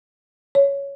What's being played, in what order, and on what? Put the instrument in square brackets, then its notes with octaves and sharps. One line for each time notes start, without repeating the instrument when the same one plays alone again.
[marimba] C#5